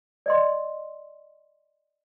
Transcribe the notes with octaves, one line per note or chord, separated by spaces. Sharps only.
D5 D#5 C6